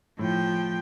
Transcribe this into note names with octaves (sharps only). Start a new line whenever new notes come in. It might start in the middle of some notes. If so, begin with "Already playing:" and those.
A2 F3 G5